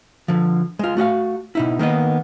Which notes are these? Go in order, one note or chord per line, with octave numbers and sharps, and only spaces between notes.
D3 F3
G#3 F4
A3 F#4 D#5 F5
B2 D#4 E4
D#3 A#3 B3 D#5